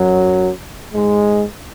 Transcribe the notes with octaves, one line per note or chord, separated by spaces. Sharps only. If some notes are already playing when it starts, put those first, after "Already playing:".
Already playing: F#2 F#3
G#2 G#3